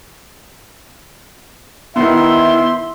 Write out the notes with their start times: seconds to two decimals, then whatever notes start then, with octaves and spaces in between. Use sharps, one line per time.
1.96 D#3 B3 E4 E5 C6